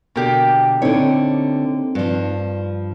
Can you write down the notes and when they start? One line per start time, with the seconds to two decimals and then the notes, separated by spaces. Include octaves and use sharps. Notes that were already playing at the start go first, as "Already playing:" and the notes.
0.16 B2 D3 A#3 G4
0.82 D3 C4 D#4 E4 C#5
1.95 G2 F3